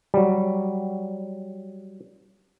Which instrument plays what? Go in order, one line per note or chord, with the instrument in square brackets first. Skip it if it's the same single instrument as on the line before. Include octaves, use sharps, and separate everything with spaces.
[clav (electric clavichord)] F#3 G3